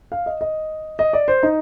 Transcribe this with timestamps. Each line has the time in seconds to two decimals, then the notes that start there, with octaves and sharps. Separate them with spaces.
0.12 F5
0.26 D#5
0.41 D#5
0.99 D#5
1.13 D5
1.28 C5
1.43 D#4